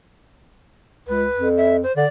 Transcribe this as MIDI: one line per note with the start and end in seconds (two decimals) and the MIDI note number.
1.08 1.26 37
1.08 1.49 71
1.37 1.80 41
1.57 1.76 76
1.83 1.95 72
1.96 2.05 50
1.96 2.08 74